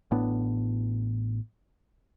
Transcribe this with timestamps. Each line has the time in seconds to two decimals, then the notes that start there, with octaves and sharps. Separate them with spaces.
0.11 A1 A2 B3 D4